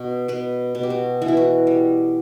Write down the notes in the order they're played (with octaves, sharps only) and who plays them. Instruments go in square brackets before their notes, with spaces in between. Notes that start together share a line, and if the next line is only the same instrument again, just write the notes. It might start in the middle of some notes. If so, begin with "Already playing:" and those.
Already playing: [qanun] B2
B2 B4
B2
G4
F#4
E3 F#4
E4
F#4
G3